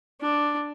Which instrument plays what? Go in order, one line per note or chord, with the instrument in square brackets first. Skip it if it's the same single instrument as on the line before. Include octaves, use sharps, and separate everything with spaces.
[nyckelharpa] D4